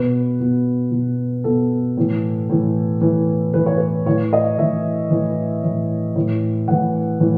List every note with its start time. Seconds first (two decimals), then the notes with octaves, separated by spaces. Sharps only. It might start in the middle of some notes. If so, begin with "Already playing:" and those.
Already playing: B2 B4
0.40 B2
0.92 B2
1.44 B2 A4
1.97 A2 E3
2.50 A2 E3
3.01 A2 E3
3.54 A2 E3 B4
3.66 C#5
3.78 B4
4.06 A2 E3 C#5
4.33 D#5
4.58 A2 E3 E5
5.11 A2 E3
5.64 A2 E3
6.16 A2 E3
6.68 A2 E3 F#5
7.20 A2 E3